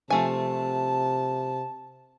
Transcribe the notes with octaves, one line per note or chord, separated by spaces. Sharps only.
C3 F3 A3 G#5 A5